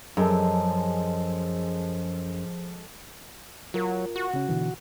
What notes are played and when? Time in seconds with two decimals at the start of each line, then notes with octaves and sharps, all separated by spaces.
0.17 F#2 F3 G#3 A4
3.74 F#3 F4 A#4
4.16 F#4
4.34 C#3 C#4
4.49 B2 D3 E3